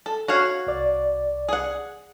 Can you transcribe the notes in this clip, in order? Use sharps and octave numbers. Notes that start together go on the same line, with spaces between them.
A4
F#4 C#5 F5
C2 D5
G#4 F#5